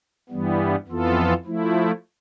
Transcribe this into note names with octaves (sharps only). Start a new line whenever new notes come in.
G2 E3 G3 B3
F2 E3 B3 F4 A4
F3 A3 E4